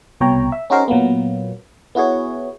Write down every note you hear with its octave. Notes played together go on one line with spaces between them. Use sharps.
C2 B2 C#5 G5 A#5
E5
C#4 D#4 F#4 G#4 A#4 C5
A#2 F#3 A#3 B3
B3 E4 F#4 G#4 C#5